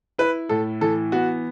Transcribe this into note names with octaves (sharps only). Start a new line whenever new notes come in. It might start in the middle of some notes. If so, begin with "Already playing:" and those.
E4 B4
A2 A4
E3 A4
B3 F#4